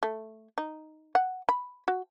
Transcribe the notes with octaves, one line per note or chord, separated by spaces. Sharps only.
A3
D#4
F#5
B5
F#4